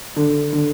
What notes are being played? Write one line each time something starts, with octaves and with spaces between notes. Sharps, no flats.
D3
D3